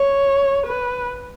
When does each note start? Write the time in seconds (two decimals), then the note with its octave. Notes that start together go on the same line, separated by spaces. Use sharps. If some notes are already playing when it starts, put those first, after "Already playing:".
Already playing: C#5
0.66 B4